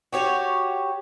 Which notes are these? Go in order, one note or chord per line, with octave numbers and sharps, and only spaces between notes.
F#4 G4 C#5